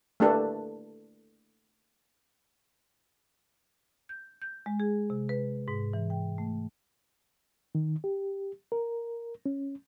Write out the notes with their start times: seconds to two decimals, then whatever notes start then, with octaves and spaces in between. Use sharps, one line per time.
0.20 A3 A#3 D4 G4 A4 B4
4.09 G6
4.42 G6
4.66 G#3
4.80 G#4
5.10 C3
5.29 B4
5.68 G#2
5.93 E3
6.10 G5
6.38 A3
7.75 D#3
8.04 G4
8.72 A#4
9.46 C#4